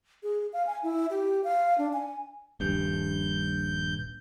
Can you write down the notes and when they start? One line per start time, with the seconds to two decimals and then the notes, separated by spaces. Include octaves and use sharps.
0.23 G#4
0.53 F5
0.67 G#5
0.83 E4
1.10 G4
1.44 F5
1.78 D4
1.93 G#5
2.60 D#1 A#1 G2 G6